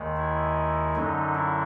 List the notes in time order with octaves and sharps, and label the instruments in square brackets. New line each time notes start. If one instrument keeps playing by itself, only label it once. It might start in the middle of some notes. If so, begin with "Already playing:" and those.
Already playing: [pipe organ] D#2 D#3 G#3
E4
F#2 D3 F#3 D#4
E4